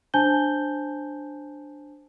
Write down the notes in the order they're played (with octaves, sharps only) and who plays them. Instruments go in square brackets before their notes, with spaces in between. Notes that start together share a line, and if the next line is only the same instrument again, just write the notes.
[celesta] D4 C5 G#5 A5 G6 G7